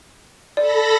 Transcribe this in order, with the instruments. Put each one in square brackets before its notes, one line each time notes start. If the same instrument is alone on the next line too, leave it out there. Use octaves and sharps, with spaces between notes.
[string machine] A4 B5 A#6 [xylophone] D5